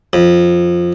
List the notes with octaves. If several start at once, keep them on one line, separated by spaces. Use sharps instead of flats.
F2